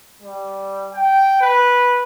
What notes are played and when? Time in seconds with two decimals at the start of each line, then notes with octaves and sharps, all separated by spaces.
0.22 G3
0.93 G5
1.41 B4